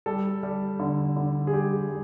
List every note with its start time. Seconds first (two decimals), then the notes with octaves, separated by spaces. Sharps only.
0.06 G3 A4
0.43 G3
0.80 D3
1.17 D3
1.47 G#4
1.53 G3 G4
1.89 G3